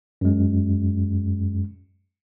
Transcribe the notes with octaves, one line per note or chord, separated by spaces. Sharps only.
F#2 G#3